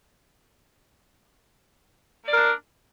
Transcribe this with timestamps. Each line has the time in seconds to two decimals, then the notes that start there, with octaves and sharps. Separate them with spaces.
2.24 A#3
2.28 D5
2.33 A#4
2.37 D4